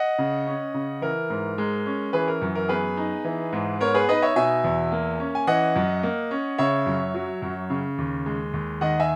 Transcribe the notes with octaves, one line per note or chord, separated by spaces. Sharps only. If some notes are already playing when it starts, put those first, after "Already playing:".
Already playing: D#5 F#5
C#3
C#4
C#3
E3 A#4
G#2
G#3
C#4
E3 G#4 B4
A#4
F#2
A#4
B3 G#4 B4
D#4
E3
G#2
B3 A#4 C#5
G#4 B4
D#4 B4 D#5
C#5 E5
B2 E5 G#5
E2
A#3
C#4
G#5
E3 D#5 F#5
F#2
A#3
C#4
C#3 C#5 E5
F#2
F#3
F#2
C#3
D#2
G#3
D#2
D#3 D#5 F#5
E5 G#5